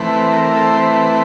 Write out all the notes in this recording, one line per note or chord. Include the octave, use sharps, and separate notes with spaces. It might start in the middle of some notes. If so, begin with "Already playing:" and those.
Already playing: E3 A3 C4 B4
A#4
A#4
A4
C5
B4